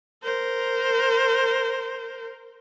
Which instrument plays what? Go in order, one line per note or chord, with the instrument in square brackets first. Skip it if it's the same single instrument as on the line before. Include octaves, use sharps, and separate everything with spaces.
[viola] A#4 C5